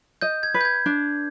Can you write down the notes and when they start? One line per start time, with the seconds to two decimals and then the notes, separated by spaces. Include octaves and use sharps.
0.21 D#5 G6
0.43 G#6
0.54 B4
0.61 G6
0.65 G#6
0.86 D4